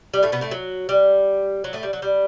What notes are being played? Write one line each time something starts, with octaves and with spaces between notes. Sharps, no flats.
G3
A2 A3
B2 B3
A2 A3
F#3
G3
F#3
A2 A3
G3
F#3
G3